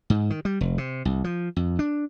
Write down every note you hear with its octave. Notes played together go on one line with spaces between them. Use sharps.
G#2
D#3
G3
F1
C3
C2
F3
F2
D4